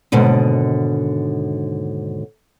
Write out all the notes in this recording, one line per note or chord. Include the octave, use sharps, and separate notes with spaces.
D#2 G#2 B2 D3